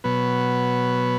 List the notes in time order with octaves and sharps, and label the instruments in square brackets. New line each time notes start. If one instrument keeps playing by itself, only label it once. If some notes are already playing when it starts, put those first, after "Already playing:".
[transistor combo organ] B2 F#3 B3 B4